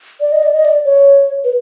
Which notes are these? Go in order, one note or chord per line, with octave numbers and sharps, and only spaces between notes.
D5
D#5
D5
D#5
D5
C#5
B4